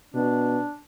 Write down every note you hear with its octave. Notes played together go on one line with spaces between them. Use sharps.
B2 D4